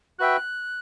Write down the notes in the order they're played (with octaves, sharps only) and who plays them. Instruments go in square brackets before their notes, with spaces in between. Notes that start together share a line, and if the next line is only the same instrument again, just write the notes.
[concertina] F#4 B4 E5 G5 [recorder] F#6